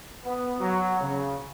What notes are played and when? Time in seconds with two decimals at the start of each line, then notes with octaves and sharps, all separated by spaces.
0.25 B3
0.60 F#3
1.01 C#3